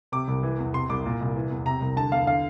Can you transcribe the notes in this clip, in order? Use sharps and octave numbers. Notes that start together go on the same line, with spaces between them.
C3 D6
C2
E3
E2
C3 C6
C2 D6
A#2
C2
E3
E2
C3 A#5
C2
D3 A5
E2 F5
D3 F5